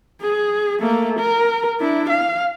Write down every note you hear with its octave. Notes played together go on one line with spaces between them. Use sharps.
G#4
A3 A#3
A#4
D4 E4
F5